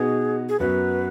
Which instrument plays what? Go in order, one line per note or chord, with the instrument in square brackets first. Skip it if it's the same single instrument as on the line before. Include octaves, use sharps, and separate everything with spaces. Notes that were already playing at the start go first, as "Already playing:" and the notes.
Already playing: [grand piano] B2 B3 D#4 F#4 [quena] G#4
[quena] G#4
[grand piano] F#2 F#3 B3 F#4 [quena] B4